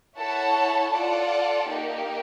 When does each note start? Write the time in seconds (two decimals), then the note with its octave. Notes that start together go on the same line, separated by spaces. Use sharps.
0.18 E4 A4 C#5 F#5 A5
0.92 F4 A4 D5 F#5
1.67 A#3 D#4 G4